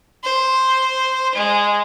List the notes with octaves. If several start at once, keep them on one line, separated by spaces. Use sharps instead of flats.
C5
G#3